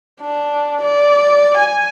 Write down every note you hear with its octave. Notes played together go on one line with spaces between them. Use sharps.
D4
D5
G#5